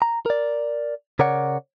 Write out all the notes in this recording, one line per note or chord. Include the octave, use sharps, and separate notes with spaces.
A#5
A#4 D5
C#3 A#4 C#5 D5 F#5